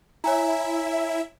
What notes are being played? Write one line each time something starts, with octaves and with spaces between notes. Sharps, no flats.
E4 C#5 E5 G#5 A#5